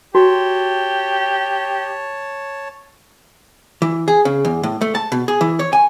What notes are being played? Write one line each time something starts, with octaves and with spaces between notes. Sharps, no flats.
F#4 G4 C#5 A5
E3
G#4
C#3
E2
A2
A3
A5
B2
G#4
E3
C#5
G#5